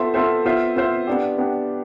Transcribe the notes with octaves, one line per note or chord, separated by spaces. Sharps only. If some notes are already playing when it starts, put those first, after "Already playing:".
Already playing: B3 F4 A4 C5 E5
B3 F4 A4 C5 E5
B3 F4 C5 E5
B3 F4 C5 E5
B3 D4 G4
B3 D4 G4